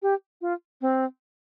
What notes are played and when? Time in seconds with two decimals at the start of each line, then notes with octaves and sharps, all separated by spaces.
0.02 G4
0.41 F4
0.81 C4